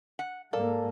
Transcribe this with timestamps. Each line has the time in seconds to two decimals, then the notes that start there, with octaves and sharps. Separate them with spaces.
0.19 F#5
0.53 G#2 A#3 A4 A#4 D5 F5